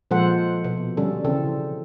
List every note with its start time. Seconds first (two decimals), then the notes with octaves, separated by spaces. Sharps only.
0.11 A#2 F3 G#3 A4 C5 F#5
0.64 B2
0.97 D3 G3 C#4 A4
1.24 C#3 E3 C4 A4